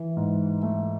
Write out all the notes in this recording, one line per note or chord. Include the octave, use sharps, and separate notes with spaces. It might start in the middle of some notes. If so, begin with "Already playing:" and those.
Already playing: E3
G#2
A3